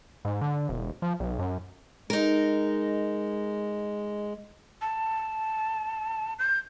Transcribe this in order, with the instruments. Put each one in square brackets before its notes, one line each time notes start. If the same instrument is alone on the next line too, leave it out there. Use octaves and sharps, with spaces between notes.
[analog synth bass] G#2
D3
E1
F3
B1
F#2
[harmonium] G#3 [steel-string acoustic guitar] D#4 A#4
[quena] A5
G6